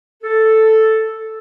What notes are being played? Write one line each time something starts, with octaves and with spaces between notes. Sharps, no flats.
A4